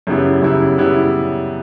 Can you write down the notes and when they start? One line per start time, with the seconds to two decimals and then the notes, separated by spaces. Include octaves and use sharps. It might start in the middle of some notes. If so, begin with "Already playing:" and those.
0.07 F#2 C#3 G3 B3 E4
0.42 F#2 C#3 G3 B3 E4
0.77 C#3 G3 B3 E4